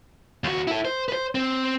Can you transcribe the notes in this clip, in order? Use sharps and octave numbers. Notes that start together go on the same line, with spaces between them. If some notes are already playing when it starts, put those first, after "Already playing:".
D#2 F#4
E4 A4
C5
B4 C5
C4